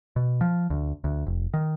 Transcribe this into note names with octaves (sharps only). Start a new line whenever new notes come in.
B2
F3
D2
D2
F1
D#3